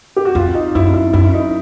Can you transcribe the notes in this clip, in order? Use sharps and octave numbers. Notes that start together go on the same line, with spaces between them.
G4
F#4
F2 F4
D#4
F#2 E4
E4
F#2 E4
D#4